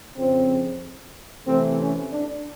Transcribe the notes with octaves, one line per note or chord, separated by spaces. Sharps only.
F2 C#3 F3 C4
C3 E3 A3 C4
C#4
D4